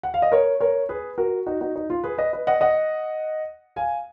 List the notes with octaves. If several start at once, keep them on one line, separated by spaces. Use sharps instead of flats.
F#5
F5
D#5
A#4 C#5
A#4 C#5
G#4 B4
F#4 A#4
D#4 F#4
D#4 F#4
D#4
F4
G#4 B4
B4 D#5
B4 D#5
D#5 F#5
D#5 F#5
F5 G#5